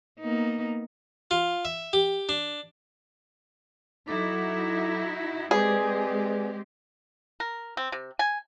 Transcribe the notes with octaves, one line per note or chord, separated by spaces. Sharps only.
A#3 B3 D#4
F4
E5
G4
D4
F#3 D#4 E4 F#4 A4 D6
G#3 C4 G4 G#4 B4 D5
A#4
C4
C3
G#5